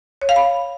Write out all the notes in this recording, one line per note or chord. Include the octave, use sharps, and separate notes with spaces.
C#5
F5
B5